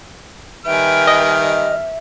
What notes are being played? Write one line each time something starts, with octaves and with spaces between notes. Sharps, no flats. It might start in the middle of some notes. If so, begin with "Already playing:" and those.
D#3 G3 B4 E5 G5 G#5 F6
D#5